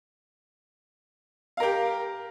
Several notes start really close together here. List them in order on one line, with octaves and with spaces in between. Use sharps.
F5 A#4 G4